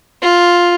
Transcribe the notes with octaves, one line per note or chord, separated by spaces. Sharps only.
F4